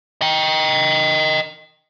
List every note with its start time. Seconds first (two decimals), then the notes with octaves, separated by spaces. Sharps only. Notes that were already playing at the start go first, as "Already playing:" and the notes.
0.21 D#5 G5